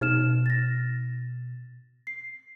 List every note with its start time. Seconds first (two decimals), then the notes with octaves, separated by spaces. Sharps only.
0.01 B2 D#4 F6 E7
0.46 A6 A#6
2.07 C7